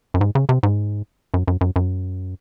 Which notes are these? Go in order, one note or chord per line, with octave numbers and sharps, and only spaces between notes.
F#2
G#2
C#3
C3
G#2
F#2
F#2
F#2
F#2